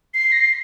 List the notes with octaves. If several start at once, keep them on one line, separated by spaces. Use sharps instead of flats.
C7
A#6
C7